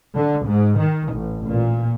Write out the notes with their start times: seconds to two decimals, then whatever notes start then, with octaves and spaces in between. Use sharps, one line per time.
0.15 D3
0.46 G#2
0.79 D#3
1.13 A1
1.46 A#2